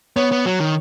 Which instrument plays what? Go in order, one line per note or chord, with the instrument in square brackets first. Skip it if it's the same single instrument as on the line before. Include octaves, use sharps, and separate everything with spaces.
[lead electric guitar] B3 [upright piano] C#5
[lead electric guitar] B3
[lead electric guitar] F#3 [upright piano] C#5
[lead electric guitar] D#3